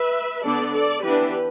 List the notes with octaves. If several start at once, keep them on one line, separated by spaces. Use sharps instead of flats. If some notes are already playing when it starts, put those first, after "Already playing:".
Already playing: B4 E5
D3 B3 D4 A4 D5
A4 D5
E3 B3 D4 G4 B4